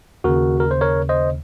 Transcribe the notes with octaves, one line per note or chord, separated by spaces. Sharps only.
D#2 C#3 F#4 A#4
A#4
C5
A#4 C#5
C5 D#5